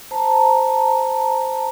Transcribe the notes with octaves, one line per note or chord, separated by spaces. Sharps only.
C5 A5 A#5